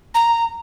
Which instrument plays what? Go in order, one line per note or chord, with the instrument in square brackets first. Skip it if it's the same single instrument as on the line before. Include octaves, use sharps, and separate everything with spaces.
[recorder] A#5